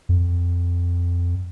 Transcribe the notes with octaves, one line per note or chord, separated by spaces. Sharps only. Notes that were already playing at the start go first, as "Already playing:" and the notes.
F2